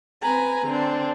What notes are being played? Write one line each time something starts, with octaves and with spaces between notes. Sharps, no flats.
C4 B4 G#5 A#5
D3 C4 D4